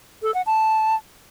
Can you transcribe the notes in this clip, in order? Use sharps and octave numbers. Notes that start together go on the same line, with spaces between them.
A4
F#5
A5